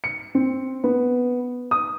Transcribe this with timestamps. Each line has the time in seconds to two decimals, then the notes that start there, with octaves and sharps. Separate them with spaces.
0.04 C#7
0.35 C4
0.84 B3
1.71 D#6